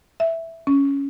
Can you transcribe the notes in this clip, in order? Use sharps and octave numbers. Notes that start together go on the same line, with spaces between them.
E5
C#4